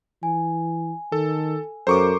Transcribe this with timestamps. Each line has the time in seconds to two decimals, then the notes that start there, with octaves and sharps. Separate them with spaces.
0.23 E3 G#5
1.12 D#3 A4
1.87 F#2 A4 A#4 C5 A#5 C#6 D6